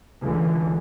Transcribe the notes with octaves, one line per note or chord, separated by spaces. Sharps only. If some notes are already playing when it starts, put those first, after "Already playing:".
C#2 D3 E3